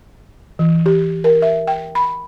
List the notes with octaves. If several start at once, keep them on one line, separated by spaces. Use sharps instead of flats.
E3
G4
A#4
E5
G5
B5